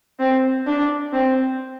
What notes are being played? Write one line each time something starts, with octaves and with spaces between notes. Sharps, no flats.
C4
D4
C4